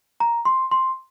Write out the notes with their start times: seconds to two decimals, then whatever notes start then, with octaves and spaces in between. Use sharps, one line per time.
0.20 A#5
0.45 C6
0.71 C6